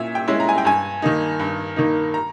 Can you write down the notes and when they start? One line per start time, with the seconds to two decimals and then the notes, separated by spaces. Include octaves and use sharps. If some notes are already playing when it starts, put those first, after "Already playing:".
Already playing: A#2 C#4 E4 E5
0.15 G5
0.28 G#3 C#4 E4
0.40 A#5
0.49 G#5
0.58 G5
0.65 G2 G#5
1.02 D#3 A#3 D#4
1.40 G2
1.76 D#3 A#3 D#4
2.14 A#5